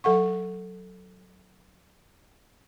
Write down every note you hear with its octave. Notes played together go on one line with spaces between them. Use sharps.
F#3 A4 F#5 C#6